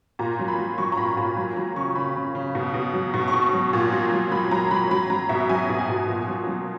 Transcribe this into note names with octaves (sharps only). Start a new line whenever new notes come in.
A#2 A#5
F#3
B5
F#3
F#3 C#6
A#5
A#2 B5
A#2 B5
F#3 B5
F#3 A#5
C#3 C#6
C#3 B5
C#3
C#3
B2
B2
F#3
B2 C#6
C#6
B2
F#3
A#2
F#3
F#3
F#3 B5
F#3 A#5
F#3 B5
F#3 B5
F#3 A#5
B2 E5
F#3 G#5
B2
G#5
B2
A#2
F#3
F#3